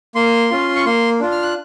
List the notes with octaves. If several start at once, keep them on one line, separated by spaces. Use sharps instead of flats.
A#3 C6
C#4 F4
C#6
A#3 C6
D4 F4
F6
F#6